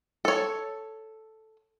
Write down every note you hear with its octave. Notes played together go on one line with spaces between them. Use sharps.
A4 C#5